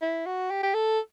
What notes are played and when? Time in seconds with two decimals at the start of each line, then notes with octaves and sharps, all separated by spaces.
0.02 E4
0.26 F#4
0.50 G4
0.63 G4
0.74 A4